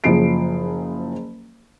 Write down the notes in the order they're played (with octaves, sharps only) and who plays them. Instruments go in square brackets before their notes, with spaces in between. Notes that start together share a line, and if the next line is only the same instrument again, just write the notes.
[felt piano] F#1 F3 G#4 C7 D7